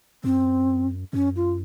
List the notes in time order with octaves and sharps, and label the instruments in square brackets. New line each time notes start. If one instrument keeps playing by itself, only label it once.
[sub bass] F#2 [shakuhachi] C4
[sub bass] F#2 [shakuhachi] C#4
[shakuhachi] F4